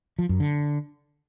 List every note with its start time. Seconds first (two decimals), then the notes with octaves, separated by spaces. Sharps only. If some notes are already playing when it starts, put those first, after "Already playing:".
0.19 F3
0.29 F#2
0.40 D3